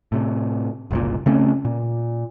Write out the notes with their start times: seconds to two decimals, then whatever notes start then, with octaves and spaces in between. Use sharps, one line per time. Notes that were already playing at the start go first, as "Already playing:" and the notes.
0.12 A2 C3
0.91 F#1 C2 A#2
1.26 C#3 A3 C4 C#4
1.65 A#2